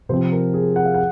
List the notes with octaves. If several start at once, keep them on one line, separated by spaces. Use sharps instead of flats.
C3 F3 C4 C5
A#4
G#4
F#5
F5
F#5